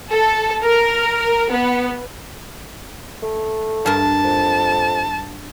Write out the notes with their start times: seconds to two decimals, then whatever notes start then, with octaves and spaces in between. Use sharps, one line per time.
0.11 A4
0.63 A#4
1.51 B3
3.23 A3
3.86 G2 A#4 A5
4.24 F2